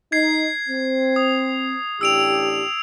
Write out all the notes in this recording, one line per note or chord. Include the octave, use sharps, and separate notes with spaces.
D#4 G#6 C7
C4
D#6
A1 D4 G4 E6 D7 F7